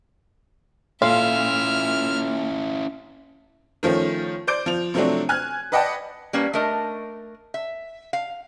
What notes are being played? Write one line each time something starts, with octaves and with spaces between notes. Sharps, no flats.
A#2 C#4 E4 A4 E5 F5 C6 F6
D#3 F3 A3 C#4
C5 D5 D6 G6 D7
F3 F7
C3 F3 F#3 A3 C4 D4
G#5 F6 F#6 G#6
B4 D5 D#5 F#5 G5 A5
G3 A#3 C#4 B4
A3 D4 A#4 D#5
E5
F5